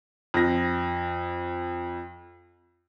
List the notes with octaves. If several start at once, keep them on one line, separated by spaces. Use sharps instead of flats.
F2 A#6